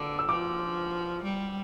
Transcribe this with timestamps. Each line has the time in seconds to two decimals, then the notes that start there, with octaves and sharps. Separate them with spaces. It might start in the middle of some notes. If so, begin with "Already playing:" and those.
Already playing: D3 D6 E6
0.19 E6
0.28 F3 D6
1.23 G3